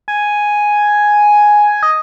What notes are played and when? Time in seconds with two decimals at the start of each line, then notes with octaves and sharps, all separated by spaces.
0.08 G#5
1.83 D#5